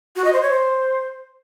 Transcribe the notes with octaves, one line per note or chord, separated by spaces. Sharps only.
F#4
D#5
C5
C#5
C5